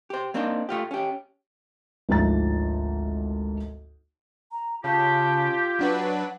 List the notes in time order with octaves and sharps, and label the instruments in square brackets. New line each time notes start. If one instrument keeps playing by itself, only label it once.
[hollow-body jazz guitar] G4 C5
A#3 C4 D4 D#4 C5
A3 F4 G4
C#4 G4
[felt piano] G#1 D2 F3 D#4 A#5 A6
[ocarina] A#5
[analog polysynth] C#3 [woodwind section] F4 G4 [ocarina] A5
[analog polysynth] F#3 D4 B4 [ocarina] F#5